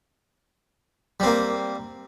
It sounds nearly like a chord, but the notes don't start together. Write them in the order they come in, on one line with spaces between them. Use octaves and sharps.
G3 C4 A#3